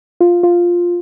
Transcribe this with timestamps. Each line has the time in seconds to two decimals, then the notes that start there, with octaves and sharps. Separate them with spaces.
0.20 F4
0.43 F4